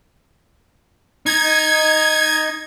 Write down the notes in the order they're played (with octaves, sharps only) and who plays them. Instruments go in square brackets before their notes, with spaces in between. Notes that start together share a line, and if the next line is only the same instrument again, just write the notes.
[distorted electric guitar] D#4 [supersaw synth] G#6